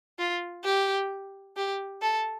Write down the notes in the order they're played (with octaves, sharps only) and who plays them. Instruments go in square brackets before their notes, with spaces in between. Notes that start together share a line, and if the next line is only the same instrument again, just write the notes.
[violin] F4
G4
G4
A4